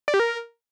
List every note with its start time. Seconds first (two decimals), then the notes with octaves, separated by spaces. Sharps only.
0.08 D5
0.14 G4
0.20 A#4